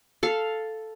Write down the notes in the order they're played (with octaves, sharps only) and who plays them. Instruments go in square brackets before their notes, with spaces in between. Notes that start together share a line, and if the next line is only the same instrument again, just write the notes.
[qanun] A4 F5